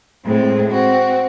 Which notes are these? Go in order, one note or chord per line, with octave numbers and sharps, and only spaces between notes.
A2 G#3 C4
C4 F#4